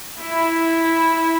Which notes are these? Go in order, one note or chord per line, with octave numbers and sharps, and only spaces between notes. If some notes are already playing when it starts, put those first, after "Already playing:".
E4